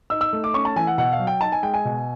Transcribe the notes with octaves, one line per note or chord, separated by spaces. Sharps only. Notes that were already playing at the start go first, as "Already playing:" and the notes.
D#4 E6
E6
A3
D6
C#4 C#6
A5
E3 G#5
F#5
B2 F#5
F5
F#3
G5
D#4 A5
G#5
G#3 G5
G#5
B2